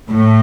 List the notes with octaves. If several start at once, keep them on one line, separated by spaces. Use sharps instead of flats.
A2